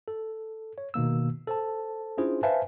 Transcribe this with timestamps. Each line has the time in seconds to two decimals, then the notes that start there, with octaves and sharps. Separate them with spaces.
0.08 A4
0.78 C#5
0.94 B2 D#3 A#3 E6
1.47 A4 C5 A5
2.18 C#4 D4 E4 F4 G#4 C5
2.43 B4 C5 E5 F5 G#5 A5